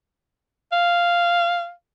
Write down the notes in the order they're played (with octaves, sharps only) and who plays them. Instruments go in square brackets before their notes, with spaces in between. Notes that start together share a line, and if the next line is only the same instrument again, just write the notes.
[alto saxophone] F5